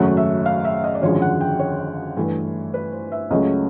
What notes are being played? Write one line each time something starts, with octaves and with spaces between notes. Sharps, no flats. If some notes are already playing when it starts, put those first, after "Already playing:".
Already playing: G#1 F#2 C#3 F#3 A3 F#5
E5
F5
E5
D#5
D5
G#1 F#2 D3 F3 G#3 C#5
F#5
G5
C#5
G2 E3 A3
B4
C5
E5
C#2 C#3 F#3 A3 D#5